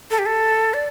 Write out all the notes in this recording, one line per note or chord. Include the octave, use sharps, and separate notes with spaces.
A4
G4
A4
D5